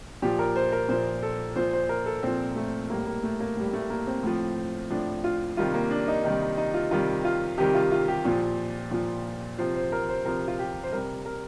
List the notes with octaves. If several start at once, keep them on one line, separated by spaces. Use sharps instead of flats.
A#2 F3 G4
A#4
C5
A#4
A#2 F3 C5
A4
A#2 F3 C5
C5
A#4
A4
A#2 F3 C4
A3
A2 G3 A#3
A#3
A3
A#3
A2 G3
A3
A#3
C4
A2 F3
A2 F3 D4
F4
C3 D#3 G3 F4
A#3
D4
D#4
C3 D#3 G3 D#4
D#4
D#4
F4
C3 D#3 G3 F4
F4
C3 D#3 G3 G4
F4
F4
G4
A#2 F3
A#2 F3
C3 F3 C5
C5
A#4
C5
C3 F3 A#4
F4
G4
C5
C3 G3 A#4
A#4